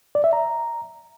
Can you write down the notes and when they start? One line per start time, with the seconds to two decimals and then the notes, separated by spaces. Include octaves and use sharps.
0.15 D5
0.24 E5
0.33 A#5